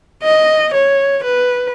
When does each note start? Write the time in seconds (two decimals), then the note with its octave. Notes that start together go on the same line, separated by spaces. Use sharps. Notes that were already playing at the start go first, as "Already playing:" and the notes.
0.23 D#5
0.74 C#5
1.25 B4